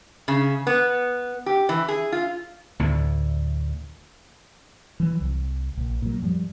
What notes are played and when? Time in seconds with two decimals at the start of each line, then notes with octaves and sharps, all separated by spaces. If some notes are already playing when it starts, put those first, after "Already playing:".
0.28 C#3
0.67 B3
1.46 G4
1.69 E3
1.88 G#4
2.12 F4
2.79 D2 A2 D3
5.00 E3 F#3
5.21 C2
5.77 A#1
6.02 A#2 F#3
6.22 F#2 F3 G3